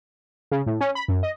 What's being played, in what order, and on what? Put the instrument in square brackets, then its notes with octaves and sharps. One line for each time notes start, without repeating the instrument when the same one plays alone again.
[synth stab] C#3
A2
C#4
B5
F#2
D#5